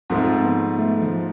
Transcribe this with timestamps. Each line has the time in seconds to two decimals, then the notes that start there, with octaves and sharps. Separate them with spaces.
0.10 G#2 F3 A3 C4
0.44 B3
0.79 A3
1.02 F3